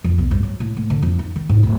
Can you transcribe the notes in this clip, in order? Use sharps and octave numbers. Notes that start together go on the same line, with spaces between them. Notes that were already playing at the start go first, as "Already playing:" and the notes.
F2
B1
G2
F#3
A2
A2
D3
F2
D#4
D#3
G#2
D1